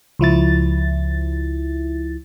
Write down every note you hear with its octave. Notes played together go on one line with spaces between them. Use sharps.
C#2 F3 E4 A6